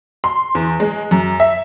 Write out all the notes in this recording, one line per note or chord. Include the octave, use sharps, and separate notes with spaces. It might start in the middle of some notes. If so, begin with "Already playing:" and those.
C6
E2
G#3
F#2
E5